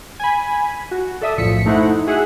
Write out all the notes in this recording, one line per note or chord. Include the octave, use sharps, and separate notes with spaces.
G#5 B5
F#4
A4 D5 E5 D#6
B1 F#2 A2 F3 B6 C#7
A3 D#4 E4 C5 F#5
F#4 G#4 E5 F#5